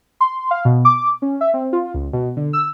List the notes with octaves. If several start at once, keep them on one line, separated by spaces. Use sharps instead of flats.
C6
F5
B2
D6
C#4
E5
C4
F4
C#2
B2
D3
E6